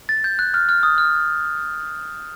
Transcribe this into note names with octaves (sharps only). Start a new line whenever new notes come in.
A6
G6
F#6
F6
F6
D#6
F6